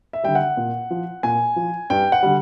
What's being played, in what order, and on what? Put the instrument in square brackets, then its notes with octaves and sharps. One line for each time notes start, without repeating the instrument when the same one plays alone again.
[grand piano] E5
D3 G3 G5
F#5
A#2
F3
A#2 G#5
F3
G2 G5
F#5
D3 G3